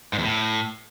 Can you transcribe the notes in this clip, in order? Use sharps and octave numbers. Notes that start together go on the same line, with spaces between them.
G#2
E2
A2